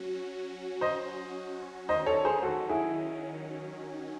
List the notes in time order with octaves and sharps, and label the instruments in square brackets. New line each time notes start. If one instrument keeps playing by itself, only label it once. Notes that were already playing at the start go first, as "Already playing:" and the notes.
Already playing: [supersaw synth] F#3 C#4 F#4
[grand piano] C5 D#5
[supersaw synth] D#3 F#3 C#4 [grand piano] C5 D#5
[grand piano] A4 C#5
G#4 C5
F#4 A4
E4 G#4